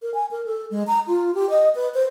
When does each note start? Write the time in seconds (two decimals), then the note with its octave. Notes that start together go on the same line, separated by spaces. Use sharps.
0.02 A#4
0.14 G#5
0.31 A#4
0.46 A4
0.71 G#3
0.87 A#5
1.07 F4
1.35 G4
1.50 D#5
1.75 B4
1.94 C5